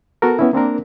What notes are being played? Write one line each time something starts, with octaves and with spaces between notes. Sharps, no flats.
B3 F#4 A4 A#4
B3 C#4 E4
A#3 C4 D4 A#4